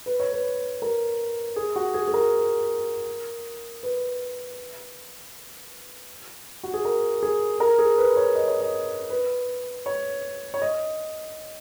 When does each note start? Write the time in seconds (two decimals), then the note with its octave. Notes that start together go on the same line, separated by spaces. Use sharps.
0.06 B4
0.20 C#5
0.32 B4
0.82 A#4
1.56 G#4
1.76 F#4
1.94 G#4
2.08 G#4
2.14 A#4
3.83 B4
6.63 F#4
6.74 G#4
6.85 A#4
7.23 G#4
7.60 A#4
7.79 G#4
7.98 B4
8.16 C#5
8.35 D#5
8.48 C#5
8.61 D#5
9.10 B4
9.86 C#5
10.54 C#5
10.62 D#5